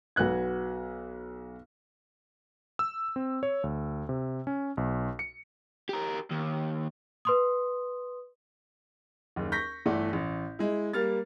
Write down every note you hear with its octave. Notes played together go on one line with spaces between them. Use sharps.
B1 F#4 B4 F#6 G#6
E6
C4
C#5
D2
C3
C#4
B1
C#7
G4 A#4
D#2
B4 C6 D#6
F#1 D#2
C#6 G6 A#6 B6
G1 E3 A3 D5
A1
G#3 E4
G3 A#3 F6 A6